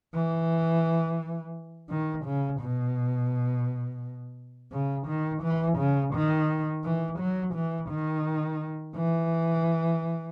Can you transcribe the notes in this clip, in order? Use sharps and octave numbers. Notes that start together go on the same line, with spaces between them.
E3
D#3
C#3
B2
C#3
D#3
E3
C#3
D#3
E3
F#3
E3
D#3
E3